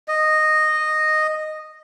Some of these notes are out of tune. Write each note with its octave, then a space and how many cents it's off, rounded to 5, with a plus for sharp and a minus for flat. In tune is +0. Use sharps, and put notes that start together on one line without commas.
D#5 -10